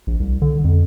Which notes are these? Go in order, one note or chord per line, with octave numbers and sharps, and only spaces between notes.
A#1
C2
D3
F2